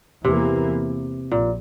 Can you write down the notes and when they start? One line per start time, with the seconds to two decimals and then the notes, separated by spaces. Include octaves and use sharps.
0.24 E2 C3 E3 A#3
1.31 A#1 A#2